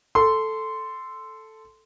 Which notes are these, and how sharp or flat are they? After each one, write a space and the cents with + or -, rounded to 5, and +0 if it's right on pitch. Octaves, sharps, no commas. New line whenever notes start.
A4 +0 C6 -10